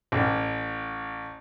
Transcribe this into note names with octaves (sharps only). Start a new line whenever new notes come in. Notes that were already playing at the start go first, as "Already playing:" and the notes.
A1